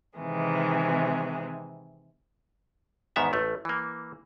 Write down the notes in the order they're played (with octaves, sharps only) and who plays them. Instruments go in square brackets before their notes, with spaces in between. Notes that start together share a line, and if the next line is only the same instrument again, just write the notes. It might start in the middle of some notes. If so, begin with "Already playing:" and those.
[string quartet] C3 D#3 E3 G#3
[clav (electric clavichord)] E2 G#2 D#3 B3 E5 A#5
A1 A3
E3 A#3